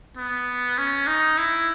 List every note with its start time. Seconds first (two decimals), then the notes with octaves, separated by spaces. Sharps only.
0.17 B3
0.78 C#4
1.07 D#4
1.38 E4